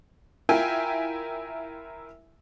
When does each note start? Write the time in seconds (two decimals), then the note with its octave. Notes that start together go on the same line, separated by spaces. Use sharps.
0.49 E4 F4 A#4 E5 G5 G#5